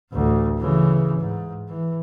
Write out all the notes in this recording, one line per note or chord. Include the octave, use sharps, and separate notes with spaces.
A1 D2
C#3 E3
G#2
E3